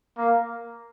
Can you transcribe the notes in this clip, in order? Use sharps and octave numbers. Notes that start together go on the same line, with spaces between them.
A#3